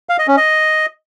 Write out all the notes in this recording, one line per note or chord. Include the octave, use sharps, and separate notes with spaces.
F5
D#5
C#4
D#5